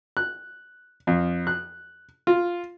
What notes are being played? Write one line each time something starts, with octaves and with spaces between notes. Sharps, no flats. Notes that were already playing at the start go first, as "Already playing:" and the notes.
F#6
F2
F#6
F4